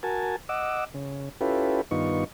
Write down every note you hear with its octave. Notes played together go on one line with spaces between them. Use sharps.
F#4 A#4 G#5 A5
D#5 F#5 D6 E6
C#3
C#4 E4 F4 G4 A4 B4
G2 D#3 B3 D#4 F4 C#6